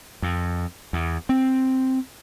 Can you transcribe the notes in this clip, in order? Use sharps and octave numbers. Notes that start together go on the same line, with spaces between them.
F2
E2
C4